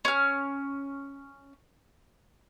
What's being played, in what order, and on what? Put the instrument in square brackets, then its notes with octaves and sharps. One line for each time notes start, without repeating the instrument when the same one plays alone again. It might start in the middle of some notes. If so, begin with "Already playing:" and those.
[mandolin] C#4 F6